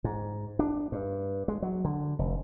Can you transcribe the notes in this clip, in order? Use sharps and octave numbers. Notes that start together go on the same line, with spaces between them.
G#2
D4
G2
G#3
F#3
D3
F1